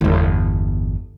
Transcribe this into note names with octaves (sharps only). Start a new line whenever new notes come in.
G1 E2